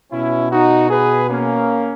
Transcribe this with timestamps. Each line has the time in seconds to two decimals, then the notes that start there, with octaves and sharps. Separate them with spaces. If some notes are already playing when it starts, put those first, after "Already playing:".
0.12 B2 C#4 E4
0.52 D#4 F#4
0.90 G#4 B4
1.30 A#3 C#4